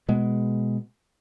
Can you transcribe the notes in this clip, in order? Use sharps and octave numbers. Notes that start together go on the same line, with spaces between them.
B2 G#3 B3